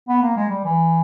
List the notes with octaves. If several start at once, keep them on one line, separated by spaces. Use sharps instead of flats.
B3
A#3
G#3
G3
E3